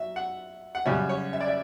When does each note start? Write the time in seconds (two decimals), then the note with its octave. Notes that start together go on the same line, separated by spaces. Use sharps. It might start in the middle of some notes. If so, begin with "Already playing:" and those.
Already playing: F#3 E5
0.16 F#5
0.75 F#5
0.86 F#2 C#3 G3 C#4 E5
1.09 C#5
1.33 E5
1.41 D5
1.48 E5